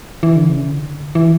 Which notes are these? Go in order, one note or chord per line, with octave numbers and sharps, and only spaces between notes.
E3
D3
C#3
D3
E3